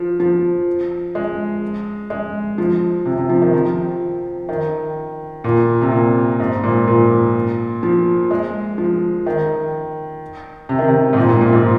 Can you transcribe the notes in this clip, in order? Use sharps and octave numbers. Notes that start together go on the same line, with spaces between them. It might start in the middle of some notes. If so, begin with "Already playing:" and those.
Already playing: F3
F3
G#3
G#3
F3
C3
C3
F3
D#3
F3
D#3
A#2
C3
A#2
G#2
A#2
A#2
F3
G#3
F3
D#3
C3
D#3
C3
G#2
A#2
A#2
A#2
G#2